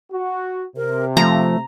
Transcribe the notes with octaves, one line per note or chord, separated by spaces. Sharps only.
F#4
C3 A#4
F3 A3 A#5